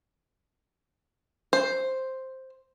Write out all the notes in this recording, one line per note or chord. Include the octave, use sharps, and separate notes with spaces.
C5